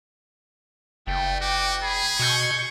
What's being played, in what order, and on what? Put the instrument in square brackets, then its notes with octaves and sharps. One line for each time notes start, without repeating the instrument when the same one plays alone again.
[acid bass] F#1 [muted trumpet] A3 [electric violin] G5
[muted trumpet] F#4 [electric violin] G5 D6
[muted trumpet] G#4 [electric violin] B5
[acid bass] B2 [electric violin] C#6 G6